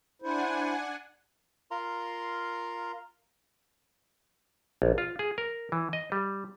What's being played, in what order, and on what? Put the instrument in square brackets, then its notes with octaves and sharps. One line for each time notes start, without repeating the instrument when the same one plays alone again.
[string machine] D4 F#5 G#5 [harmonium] E4 C5
[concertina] F4 A#4 F5 A#5 C6
[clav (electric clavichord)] A#1
F4
G#4
A#4
E3
D#5
G3